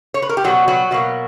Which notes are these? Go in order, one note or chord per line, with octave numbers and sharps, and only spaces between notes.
C#5
B4
A#4
G4
B2 F#3 G3 B3 F#4
F#3 F#4
B2 F#3 A#3